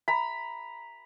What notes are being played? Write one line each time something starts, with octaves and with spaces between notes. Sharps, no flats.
A#5 B5